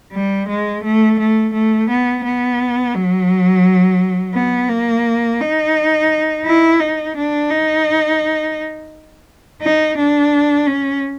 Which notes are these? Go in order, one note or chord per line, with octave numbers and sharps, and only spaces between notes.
G3
G#3
A3
A3
A3
B3
B3
F#3
B3
A#3
D#4
E4
D#4
D4
D#4
D#4
D4
C#4